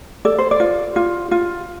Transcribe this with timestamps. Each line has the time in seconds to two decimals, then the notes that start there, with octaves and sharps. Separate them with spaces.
0.25 A4 D5
0.39 C5
0.51 D5
0.60 F4
0.96 F4
1.31 F4